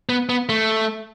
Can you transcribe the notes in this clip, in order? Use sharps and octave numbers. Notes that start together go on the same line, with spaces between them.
B3
B3
A3